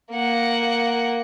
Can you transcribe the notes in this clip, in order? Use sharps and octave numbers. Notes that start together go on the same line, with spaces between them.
A#3 F#5